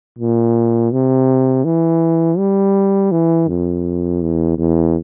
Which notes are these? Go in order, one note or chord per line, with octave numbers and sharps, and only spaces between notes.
A#2
C3
E3
G3
E3
F2
E2
E2